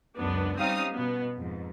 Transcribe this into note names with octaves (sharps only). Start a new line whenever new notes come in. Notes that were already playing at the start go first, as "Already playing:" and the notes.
C#2 F#2 B3 D4
G3 C4 C#4 D#4 F5 D#6
B2 B3
F2 G#2